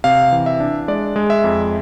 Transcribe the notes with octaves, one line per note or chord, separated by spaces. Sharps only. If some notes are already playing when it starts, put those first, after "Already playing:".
C3 F5
E3
E5
D4
G#3 D5
G#3
E5
F2